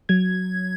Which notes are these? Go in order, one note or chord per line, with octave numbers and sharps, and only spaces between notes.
F#3 G#6